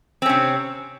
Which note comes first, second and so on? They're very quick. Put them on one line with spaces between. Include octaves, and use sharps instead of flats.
C4 C#4 C3